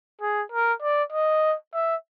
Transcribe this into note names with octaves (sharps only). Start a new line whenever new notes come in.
G#4
A#4
D5
D#5
E5